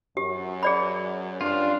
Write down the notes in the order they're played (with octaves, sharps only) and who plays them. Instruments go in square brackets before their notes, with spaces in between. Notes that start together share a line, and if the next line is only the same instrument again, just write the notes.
[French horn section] F#2 [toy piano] G4
[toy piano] G#4 D5 B5
[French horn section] G2 C#4 D4 [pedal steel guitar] F4